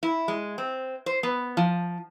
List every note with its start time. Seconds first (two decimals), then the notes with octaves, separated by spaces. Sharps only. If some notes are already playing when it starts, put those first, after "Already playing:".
0.03 E4
0.28 G#3
0.58 C4
1.06 C5
1.23 B3
1.57 F3